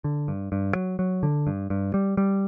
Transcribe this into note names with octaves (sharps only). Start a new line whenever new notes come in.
D3
G2
G2
F#3
F#3
D3
G2
G2
G3
G3